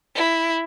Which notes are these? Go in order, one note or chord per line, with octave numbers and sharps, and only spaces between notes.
E4